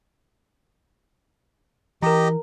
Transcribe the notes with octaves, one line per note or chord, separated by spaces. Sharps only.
E3 G4 A#4 D#5 A#5